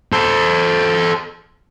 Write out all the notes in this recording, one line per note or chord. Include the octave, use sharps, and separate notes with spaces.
A4 C5